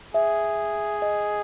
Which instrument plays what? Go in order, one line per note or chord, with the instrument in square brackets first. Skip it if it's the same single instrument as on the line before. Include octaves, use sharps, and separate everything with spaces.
[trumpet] G#4 [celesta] E5
[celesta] D#5